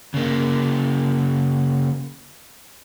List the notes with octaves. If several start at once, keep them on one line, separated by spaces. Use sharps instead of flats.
C#3 A#3